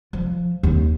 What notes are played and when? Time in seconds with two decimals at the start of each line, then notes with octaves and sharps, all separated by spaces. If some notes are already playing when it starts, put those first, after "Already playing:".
0.13 F3
0.63 D#2